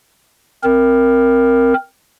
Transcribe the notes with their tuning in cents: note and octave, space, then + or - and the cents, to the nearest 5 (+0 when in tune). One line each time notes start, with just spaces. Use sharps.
C4 +0 A#4 +0